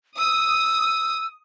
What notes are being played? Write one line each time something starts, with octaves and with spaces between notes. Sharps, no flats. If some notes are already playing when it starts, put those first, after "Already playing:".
D#6 E6